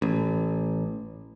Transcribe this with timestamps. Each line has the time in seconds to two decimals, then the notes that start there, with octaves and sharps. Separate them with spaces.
0.02 A1